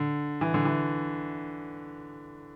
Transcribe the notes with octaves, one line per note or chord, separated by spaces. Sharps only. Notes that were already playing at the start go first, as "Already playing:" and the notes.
Already playing: D3
E3
D3
E3